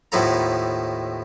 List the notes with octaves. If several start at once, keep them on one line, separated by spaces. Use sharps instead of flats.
D#2 A2 F3 B3 A4 A#5